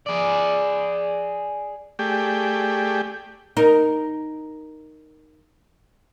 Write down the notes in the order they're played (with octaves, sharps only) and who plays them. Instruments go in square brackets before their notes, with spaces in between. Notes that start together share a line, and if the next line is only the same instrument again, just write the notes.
[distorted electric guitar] G#4 D5
[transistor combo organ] A3 G4 G#4 D5 G5
[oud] D#4 A#4